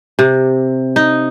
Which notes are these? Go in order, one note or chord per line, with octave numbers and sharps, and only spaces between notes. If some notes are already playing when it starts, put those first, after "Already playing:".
C3
D#4